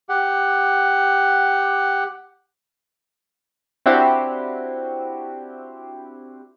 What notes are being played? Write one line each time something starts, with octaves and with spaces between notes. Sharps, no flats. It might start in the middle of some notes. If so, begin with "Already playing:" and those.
G4 F#5
C4 D4 E4 F#4 G4 C5